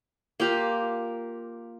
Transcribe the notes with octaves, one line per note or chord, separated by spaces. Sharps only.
A#3 F4 G4